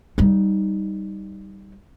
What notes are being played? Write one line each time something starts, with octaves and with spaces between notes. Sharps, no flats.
G3 D#4